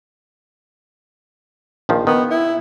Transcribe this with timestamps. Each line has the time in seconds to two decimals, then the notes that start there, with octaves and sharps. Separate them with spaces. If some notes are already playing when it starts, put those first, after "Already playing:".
1.89 A#1 D#3 F3
2.07 D#3 B3
2.31 E4